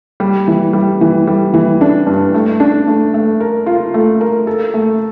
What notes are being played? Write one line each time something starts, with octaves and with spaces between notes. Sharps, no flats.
G3
E3
G3
E3
G3
E3
D4
G2
A3
D4
A3
A3
A#4
F4
A3
A#4
A4
A3